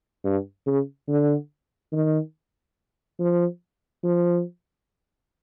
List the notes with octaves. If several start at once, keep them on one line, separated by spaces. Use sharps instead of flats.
G2
C#3
D3
D#3
F3
F3